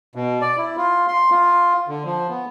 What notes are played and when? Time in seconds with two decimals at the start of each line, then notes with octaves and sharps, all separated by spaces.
0.15 B2
0.41 D5
0.58 E4
0.77 F4
1.08 C6
1.31 F4
1.88 D3
2.05 F3
2.29 B3